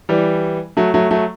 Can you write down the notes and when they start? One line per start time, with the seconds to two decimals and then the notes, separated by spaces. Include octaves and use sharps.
0.09 E3 G3
0.77 F#3 A3
0.94 F#3 A3
1.11 F#3 A3